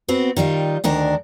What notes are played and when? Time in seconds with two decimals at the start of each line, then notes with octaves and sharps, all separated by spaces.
0.08 B3 C4 F#4
0.36 D#3 G3 D#4 F4
0.84 D2 D#3 D4 A#4